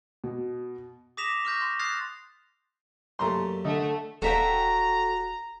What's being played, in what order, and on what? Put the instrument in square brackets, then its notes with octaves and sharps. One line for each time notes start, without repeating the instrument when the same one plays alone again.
[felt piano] B2
[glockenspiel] D6 D#6 A#6 B6 E7 F7
C#6 F6 G6 A#6
C6
D#6 F6 F#6 A6 C7 F7
[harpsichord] F#2 G3 A#3 [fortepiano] A3 A#5 C6
[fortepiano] D3 D#5 [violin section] A3
[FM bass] D#1 [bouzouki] F#4 E5 G5 [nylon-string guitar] A4 D5 F5 [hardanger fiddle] A#5